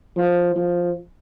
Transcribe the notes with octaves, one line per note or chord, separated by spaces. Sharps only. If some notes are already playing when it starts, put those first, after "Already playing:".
F3
F3